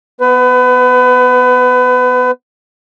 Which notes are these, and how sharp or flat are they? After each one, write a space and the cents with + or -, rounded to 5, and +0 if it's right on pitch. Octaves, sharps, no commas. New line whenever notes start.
B3 +0 B4 +30